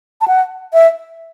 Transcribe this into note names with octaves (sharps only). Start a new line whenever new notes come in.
A5
F#5
E5